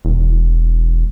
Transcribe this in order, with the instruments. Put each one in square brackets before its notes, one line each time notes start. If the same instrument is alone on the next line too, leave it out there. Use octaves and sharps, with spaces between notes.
[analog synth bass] E1